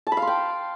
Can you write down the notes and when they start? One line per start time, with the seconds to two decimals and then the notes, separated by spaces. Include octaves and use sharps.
0.07 A5
0.12 B5
0.17 F5
0.22 C6
0.27 G5